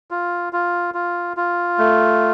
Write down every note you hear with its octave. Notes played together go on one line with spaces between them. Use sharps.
F4
F4
F4
F4
A3